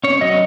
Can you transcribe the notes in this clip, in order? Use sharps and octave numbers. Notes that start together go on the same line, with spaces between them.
C#4 C#5
F#3 D#5